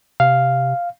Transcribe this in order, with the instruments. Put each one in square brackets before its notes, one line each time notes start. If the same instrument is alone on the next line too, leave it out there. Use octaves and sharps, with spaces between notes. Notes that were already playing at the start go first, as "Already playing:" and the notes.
[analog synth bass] C3 [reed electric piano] F5